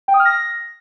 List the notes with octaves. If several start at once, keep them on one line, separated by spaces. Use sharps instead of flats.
G5
D#6
F6
A#6